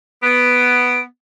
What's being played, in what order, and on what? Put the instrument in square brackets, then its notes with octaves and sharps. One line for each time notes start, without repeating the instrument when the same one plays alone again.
[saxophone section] B3 [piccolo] D7